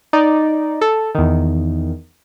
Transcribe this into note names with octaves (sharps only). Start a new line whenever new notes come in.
D#4 D5
A4
E2 D#3